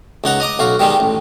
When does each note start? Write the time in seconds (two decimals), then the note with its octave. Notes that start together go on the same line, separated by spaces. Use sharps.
0.24 C#2 D#4 F#5 A#5
0.40 D#5 A#5 D6 D#6
0.59 B1 F#4 F5
0.79 D#3 G3 G#3 D#4
1.00 A1